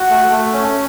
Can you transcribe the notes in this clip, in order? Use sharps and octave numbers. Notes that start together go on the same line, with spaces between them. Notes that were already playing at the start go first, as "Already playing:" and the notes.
Already playing: F#4
A3
A3
C#4